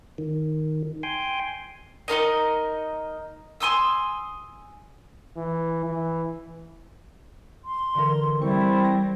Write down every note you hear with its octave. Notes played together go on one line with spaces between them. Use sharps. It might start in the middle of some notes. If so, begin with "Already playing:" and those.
D#3
G5 G#5 C6
D#4 F4 A#4 D#5
G#5 C6 D#6 E6
E3
E3
C6
D3 E3 A#4
G3 C4 E4 C#6
A#6